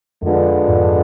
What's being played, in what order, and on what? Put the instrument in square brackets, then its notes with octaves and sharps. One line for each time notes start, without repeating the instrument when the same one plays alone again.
[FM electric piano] F2 [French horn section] D3 G#3 B3 D4 F4
[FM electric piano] F2 G#2